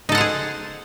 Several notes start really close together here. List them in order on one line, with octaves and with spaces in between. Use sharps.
D#4 A4 F#5 C5 G#4